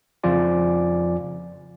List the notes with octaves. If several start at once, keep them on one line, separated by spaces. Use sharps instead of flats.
F2 C#3 F3 F4 D5 G#5